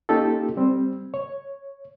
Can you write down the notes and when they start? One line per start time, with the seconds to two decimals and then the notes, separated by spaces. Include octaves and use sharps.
0.09 A#3 C#4 D#4 F4 G4 A4
0.57 G3 C4
1.14 C#5